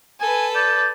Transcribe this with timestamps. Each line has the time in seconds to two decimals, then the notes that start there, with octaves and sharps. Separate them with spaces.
0.20 A4 B4 G#5
0.55 D5 G6